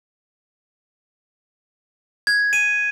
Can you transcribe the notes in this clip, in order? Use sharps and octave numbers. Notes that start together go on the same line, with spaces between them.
G#6
D#7